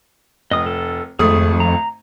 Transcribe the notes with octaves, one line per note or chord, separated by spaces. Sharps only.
F1 D#5 D#6
A4
G#1 F2 A3 G#4 D#6
A#5